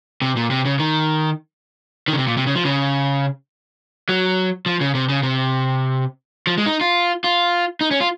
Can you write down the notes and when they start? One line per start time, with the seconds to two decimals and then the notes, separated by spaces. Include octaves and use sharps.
0.22 C3
0.36 A#2
0.51 C3
0.65 C#3
0.79 D#3
2.08 D#3
2.13 C#3
2.18 C3
2.27 A#2
2.37 C3
2.46 C#3
2.55 F3
2.65 C#3
4.09 F#3
4.66 F3
4.81 C#3
4.95 C3
5.09 C#3
5.23 C3
6.47 F3
6.58 G#3
6.66 D#4
6.81 F4
7.24 F4
7.81 D#4
7.91 C#4
8.01 F4